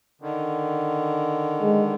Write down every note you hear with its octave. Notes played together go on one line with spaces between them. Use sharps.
D3 D#3
G#3